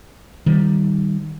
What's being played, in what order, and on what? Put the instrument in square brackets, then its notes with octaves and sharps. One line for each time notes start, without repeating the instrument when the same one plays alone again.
[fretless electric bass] D#3 G3